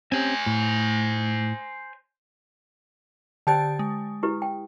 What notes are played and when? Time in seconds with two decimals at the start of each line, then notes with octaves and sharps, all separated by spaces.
0.12 C4 C#4 G4 C5 G#5
0.46 A2
3.47 D3 G4 C5 G5 A5 A6
3.79 G#3
4.23 E4 G4 B4
4.42 G5